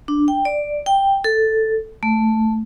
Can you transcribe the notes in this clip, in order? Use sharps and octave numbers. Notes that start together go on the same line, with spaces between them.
D4
G5
D5
G5
A4
A3